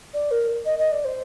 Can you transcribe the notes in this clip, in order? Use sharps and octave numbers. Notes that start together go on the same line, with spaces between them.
D5
A#4
D#5
D#5
D5
C5